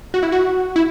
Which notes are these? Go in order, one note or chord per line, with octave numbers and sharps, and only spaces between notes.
F#4
E4
F#4
E4